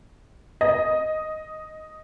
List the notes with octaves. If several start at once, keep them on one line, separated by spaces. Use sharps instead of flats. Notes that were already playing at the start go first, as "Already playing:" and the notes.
D#5